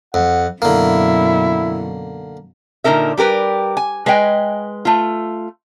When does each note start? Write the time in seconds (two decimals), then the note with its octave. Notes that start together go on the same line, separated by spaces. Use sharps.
0.14 F2 F#5
0.62 F#2 B2 D3 A#3 E4
2.84 A#2 D3 D#4 A#4 E5
3.17 G3 G4 A#4 B4
3.77 G#5
4.06 G#3 B4 D#5 G5 G#5
4.85 A3 F4